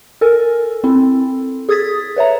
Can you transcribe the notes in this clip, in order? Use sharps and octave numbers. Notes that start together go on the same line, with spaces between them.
A4 A#4 G#5
C4 E4 A4
G#4 A4 D#6 G#6 A6 B6
B4 C#5 E5 A#5